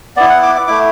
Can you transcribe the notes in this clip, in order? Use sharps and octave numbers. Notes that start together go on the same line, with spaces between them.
B3 E4 D5
F#5
D6
D6
A3 E4 D6